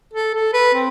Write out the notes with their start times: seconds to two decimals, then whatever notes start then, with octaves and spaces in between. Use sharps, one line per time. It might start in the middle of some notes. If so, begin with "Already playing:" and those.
0.14 A4
0.34 A4
0.53 B4
0.74 C4